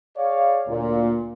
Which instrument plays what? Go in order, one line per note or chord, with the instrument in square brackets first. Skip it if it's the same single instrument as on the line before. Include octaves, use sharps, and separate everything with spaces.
[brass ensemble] G#4 C#5 D5 F5
D2 A#2